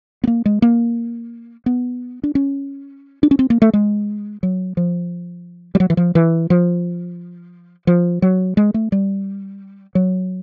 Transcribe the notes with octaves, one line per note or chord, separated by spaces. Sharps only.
B3
A#3
G#3
A#3
B3
D4
C#4
D4
C#4
C4
A#3
A3
G#3
F#3
F3
G3
F#3
E3
F3
E3
F3
F3
F#3
G#3
A3
G3
F#3